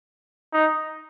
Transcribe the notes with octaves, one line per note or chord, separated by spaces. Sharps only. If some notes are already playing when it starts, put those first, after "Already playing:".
D#4